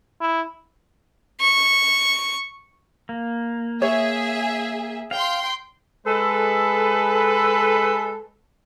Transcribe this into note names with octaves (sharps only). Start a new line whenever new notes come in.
E4
C#6
A#3
G#4 C#5 E5
F5 G5 C6
G#3 A4 B4